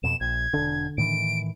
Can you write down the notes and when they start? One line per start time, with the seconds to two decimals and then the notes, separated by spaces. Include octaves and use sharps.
0.03 F2 B2 E7
0.21 A#1 G#6
0.54 E1 D3 D4
0.98 A2 D#3 E3 D7